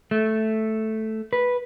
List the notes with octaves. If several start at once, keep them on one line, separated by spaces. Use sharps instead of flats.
A3
B4